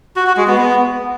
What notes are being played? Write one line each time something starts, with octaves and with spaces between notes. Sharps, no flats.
F#4
F#4
G#3
B3
B3